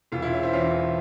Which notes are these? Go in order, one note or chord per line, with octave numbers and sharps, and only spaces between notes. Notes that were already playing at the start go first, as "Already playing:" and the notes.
E1 F4
E4
C#4
C4 E4
E2 C#4 F4